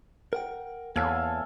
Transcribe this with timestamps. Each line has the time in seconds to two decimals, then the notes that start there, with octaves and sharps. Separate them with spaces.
0.33 A#4 F#5 G5
0.96 E2 A#3 A4 C#5 F5 G#5